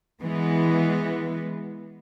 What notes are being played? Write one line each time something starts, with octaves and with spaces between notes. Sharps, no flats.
E3 G#3 B3